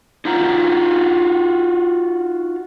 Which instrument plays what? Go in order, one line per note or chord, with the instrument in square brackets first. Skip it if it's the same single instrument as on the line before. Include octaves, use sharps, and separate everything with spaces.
[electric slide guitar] D#4 F4 F#4 A#5